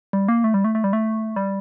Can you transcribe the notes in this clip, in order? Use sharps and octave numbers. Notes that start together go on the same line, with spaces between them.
G3
A#3
A3
G3
A3
A3
G3
A3
G3